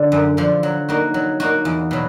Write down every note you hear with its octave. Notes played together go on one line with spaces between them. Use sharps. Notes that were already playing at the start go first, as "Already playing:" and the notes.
Already playing: D3
F#2
D3 F3
F#3
A#3 D#4 F#4
F#3
A#3 D#4 F#4
E2
B2 F#3